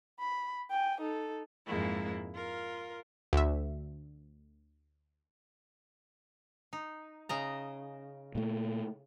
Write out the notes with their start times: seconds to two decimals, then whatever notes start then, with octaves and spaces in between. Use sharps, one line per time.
0.20 B5
0.71 G5 G#5
1.01 D#4 A4
1.67 F2 G#2 G#3 A#3 E4
2.35 F4 A#4
3.33 D2 E5
6.73 D#4
7.29 C#3 D#5 A#5
8.35 A#2 A3